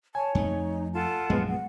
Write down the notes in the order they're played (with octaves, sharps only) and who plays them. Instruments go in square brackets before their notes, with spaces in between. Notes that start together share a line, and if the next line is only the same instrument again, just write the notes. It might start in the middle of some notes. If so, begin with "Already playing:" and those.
[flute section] C#5 [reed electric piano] G#5 [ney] A5
[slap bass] F2 A3 [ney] D#4
[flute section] F4 F#5 A5 [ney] A4
[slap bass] A#1 F#2 C#3 [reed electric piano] G#3 B3
[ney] F#5